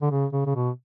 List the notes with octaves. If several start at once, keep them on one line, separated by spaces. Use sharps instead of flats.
D3
C#3
C#3
C#3
B2